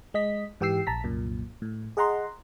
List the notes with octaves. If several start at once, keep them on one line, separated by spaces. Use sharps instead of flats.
G#3 D#5 B6
G#2 E3 G4 G5 E6 C7
A#1 A5 A#5 B6
C2 F#2 A#2
A2
G#4 D#5 F#5 A#5 C6